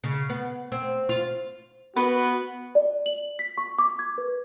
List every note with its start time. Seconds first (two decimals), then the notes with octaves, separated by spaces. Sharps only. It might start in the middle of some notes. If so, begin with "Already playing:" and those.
0.04 C#3
0.30 B3
0.72 C4
1.09 F4
1.96 B3 F#4 B4
2.75 D5
3.06 F#7
3.39 B6
3.58 C#6
3.79 D6
3.99 G#6
4.18 B4